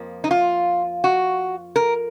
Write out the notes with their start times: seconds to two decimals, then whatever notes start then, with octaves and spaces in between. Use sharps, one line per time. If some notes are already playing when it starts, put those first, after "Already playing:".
Already playing: F2 F3 A#3
0.24 D#4
0.31 F4
1.04 F#4
1.76 A#4